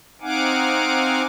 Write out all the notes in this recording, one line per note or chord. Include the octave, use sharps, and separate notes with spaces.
C4 D#4 F5 F#5 G#5 D6